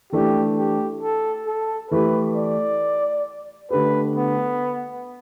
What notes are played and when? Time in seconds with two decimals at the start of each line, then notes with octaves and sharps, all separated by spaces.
0.12 E3 A3 D4 G4
0.57 G4
1.02 A4
1.47 A4
1.91 E3 A3 G4 B4
2.36 D5
3.70 D3 A3 G4 B4
4.16 B3